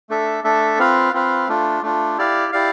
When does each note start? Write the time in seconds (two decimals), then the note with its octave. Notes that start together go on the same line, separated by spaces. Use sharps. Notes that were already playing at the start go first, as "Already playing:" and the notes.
0.09 A3 D4 A4 E5
0.44 A3 D4 A4 E5
0.78 C4 F4 B4 F5
1.13 C4 F4 B4 F5
1.48 A3 D4 F4
1.83 A3 D4 F4
2.18 E4 G4 D5 F5
2.52 E4 G4 D5 F5